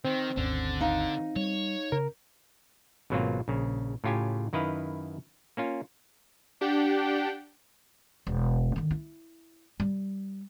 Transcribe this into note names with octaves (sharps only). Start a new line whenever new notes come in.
D#3 C4
G#1 D#2 D3 C#4
D#4 F5
G3 C#5
C#3 A#4
G#1 B2 F#3 A#3 C4 F4
A#1 C#3
A2 C#3 F4 G4 G#5
F#2 D#3 E4 B4 D#5 F5
A#3 C#4 F4
D4 G4 F#5 G5
E1
D3 D#3
E4
G3